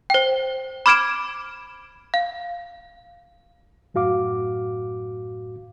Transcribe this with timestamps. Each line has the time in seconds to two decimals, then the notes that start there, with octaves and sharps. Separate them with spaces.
0.10 C5 G5
0.86 B5 D6 F6 G#6 D7 E7
2.14 F5
3.94 F#2 A2 F#4 F5 D6